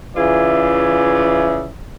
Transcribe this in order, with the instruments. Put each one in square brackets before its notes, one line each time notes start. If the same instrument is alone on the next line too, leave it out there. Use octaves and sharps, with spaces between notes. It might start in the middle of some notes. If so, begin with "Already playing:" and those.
[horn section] C#3 E3 F4 G#4 D5 E5